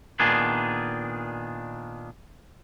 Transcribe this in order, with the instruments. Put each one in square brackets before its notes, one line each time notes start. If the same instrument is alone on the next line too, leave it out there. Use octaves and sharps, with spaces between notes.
[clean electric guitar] A#2 D#3 B3 D4 G#4